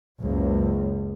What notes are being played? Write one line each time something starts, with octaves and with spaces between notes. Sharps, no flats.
F#1 C#2